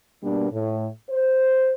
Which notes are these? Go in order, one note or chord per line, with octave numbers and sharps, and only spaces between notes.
B2 G3 A#3 B3 D4
A2
C5